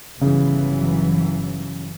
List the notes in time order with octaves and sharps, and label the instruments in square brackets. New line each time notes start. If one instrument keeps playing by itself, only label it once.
[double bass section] G1 E3 F#3 [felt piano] C#3